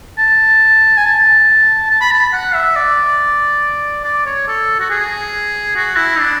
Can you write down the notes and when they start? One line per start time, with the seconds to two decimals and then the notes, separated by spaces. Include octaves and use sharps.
0.18 A5
0.97 G#5
1.05 A5
1.90 A5
2.01 B5
2.11 A5
2.33 F#5
2.55 E5
2.76 D5
4.04 D5
4.26 C#5
4.48 A4
4.80 F#4
4.90 G#4
5.76 F#4
5.97 E4
6.19 D4